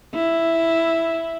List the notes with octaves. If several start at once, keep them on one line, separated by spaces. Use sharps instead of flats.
E4